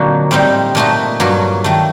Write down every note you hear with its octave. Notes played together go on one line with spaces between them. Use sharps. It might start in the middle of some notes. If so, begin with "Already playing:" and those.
Already playing: A#2 D3 F#3 A#3 C4 D#4 F#4
A2 G3 C4 D#4
A#2 A3 D#4 F#4
G2 F#3 A#3 F#4
D#3 A3